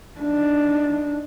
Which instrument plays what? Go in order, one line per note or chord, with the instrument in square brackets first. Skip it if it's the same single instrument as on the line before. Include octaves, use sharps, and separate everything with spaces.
[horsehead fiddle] D4 D#4